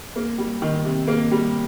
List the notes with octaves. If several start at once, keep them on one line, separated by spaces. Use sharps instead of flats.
A#3
G3
D#3
C3
A#3
G3